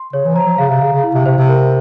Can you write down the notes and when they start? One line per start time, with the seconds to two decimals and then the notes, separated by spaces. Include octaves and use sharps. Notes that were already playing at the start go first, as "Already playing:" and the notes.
Already playing: C6
0.13 C#3 C#5
0.25 E3
0.35 F3 A#5
0.47 F3
0.58 C#3 F5
0.69 C3
0.81 C#3 F5
0.92 C#3
1.03 E4
1.15 C3
1.26 C3 C5
1.38 C3
1.49 A#4